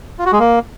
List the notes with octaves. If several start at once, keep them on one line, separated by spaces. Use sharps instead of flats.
F4
F#4
G#3
A#3